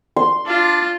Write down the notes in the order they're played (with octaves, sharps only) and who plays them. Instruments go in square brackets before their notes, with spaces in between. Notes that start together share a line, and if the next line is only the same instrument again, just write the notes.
[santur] C6
[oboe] D4 [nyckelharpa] F4